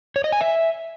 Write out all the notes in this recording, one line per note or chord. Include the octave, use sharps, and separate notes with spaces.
C#5
D#5
G#5
E5